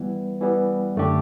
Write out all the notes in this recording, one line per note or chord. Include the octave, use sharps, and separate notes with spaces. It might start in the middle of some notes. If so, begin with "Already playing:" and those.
Already playing: E3 G3 B3
E3 G3 B3
F#2 D3 A3 D4 G4